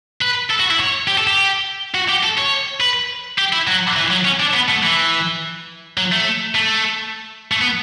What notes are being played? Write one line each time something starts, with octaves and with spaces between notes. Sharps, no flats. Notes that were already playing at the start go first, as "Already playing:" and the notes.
B4
A4
F#4
E4
C#5
G4
A4
G4
F#4
G4
A4
C#5
B4
G4
E4
F#3
E3
F#3
C#4
D4
B3
A3
E3
F#3
A3
A3
A3
B3